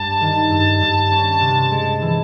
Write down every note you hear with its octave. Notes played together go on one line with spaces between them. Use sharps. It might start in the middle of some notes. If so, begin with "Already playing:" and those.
Already playing: G2 G3 A5
D#3
G2
G2
C#4
C3
G#3
E3